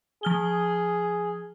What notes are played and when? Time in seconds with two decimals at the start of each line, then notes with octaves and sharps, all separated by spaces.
0.23 F3 G#4 F6 G7